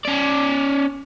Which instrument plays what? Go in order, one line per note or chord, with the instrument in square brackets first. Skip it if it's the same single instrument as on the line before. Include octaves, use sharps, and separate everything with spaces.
[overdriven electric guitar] C#4 D5